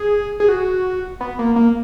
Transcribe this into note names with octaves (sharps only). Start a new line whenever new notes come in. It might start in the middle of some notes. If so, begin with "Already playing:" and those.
Already playing: G#4
G#4
F#4
B3
A#3
A#3